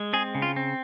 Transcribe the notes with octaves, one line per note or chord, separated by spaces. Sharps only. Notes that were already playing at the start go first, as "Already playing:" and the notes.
Already playing: G#3
C4 G#4
C#3
F4
C4